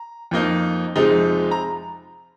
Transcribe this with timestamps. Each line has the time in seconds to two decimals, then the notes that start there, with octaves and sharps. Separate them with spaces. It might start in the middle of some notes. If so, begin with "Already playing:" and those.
Already playing: A#5
0.31 F2 F3 A#3 D#4
0.96 F2 C3 F3 G#3 D#4
1.51 A#5